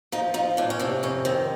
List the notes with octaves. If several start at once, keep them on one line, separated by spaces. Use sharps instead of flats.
F3 D#4
F3 D#4
A2 D4
C#4
C3 D4
F2 C#4
D#3 C4